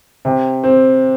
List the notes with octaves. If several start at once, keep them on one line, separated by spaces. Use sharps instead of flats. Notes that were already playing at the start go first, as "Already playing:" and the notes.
C3
C4